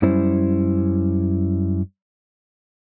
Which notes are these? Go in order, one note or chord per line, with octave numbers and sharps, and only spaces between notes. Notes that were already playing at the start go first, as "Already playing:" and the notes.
F#2 G3 C#4 E4 C5